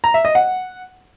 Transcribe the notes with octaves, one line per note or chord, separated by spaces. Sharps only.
A#5
E5
D#5
F#5